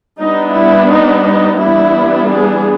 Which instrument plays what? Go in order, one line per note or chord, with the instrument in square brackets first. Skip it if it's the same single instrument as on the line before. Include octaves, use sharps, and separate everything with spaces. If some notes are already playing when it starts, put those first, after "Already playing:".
[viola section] G3 B3 D4 D#4
E4
D#4
D#4
E3 G3 B3 D4 E4
G#4